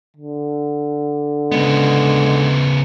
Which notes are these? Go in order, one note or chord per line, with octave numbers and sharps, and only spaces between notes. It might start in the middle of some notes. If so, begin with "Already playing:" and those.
D3
C#3 G#3 B3